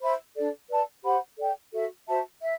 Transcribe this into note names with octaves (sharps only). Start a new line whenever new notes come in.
C5 E5 B5
D4 A4 D5
B4 D5 A5
G4 C5 F#5 B5
A4 D5 G5
F#4 A4 E5
F#4 C5 E5 A5
E5